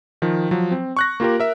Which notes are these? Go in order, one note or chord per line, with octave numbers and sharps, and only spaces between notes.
D#3 F3
F3 F#3
C4
C#6 F#6 A#6
A#3 F4 G4 A#4
A#4 E5